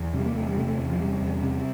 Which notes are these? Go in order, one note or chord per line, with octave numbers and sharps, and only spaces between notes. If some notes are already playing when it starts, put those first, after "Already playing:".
Already playing: E2
C3 G3
A#3
E2 A3
G3
C3 A3
A3
E2 E3
F3
C3 G3
E2
C3